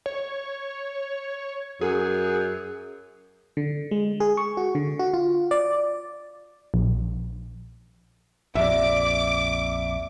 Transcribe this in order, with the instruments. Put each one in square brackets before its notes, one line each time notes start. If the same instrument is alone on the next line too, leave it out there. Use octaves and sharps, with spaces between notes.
[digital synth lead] C#5
[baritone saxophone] F#2 [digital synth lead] G#4
[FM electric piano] D3
G#3
G#4
C#6
F#4
D3
F#4
F4
D5
[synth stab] A#1
[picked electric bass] A#1 F2 [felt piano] D5 E5 [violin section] D6